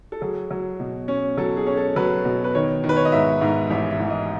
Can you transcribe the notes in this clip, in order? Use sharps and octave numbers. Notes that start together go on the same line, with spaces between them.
A4
F#3 G#4
F#3
B2
C#4
F#3 A4
G#4
C#4
A4
F#3 B4
B2
B4
D#3 C#5
D#3
B4
C#5
D#5
G#2 E5
G#2
A1 E5
E5
A1
D#5